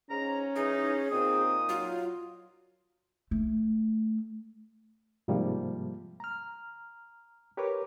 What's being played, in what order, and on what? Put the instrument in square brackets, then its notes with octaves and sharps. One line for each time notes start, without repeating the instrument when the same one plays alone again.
[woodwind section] G#2 A#5 [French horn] C#4
[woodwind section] E3 D#4 [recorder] G#4
[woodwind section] A#2 D#4 D#6 [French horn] C4
[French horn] F#3 [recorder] F4
[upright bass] A3
[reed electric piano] G#2 C3 F3 G3 A#3
A#5 F6
G4 A#4 B4 C#5 D6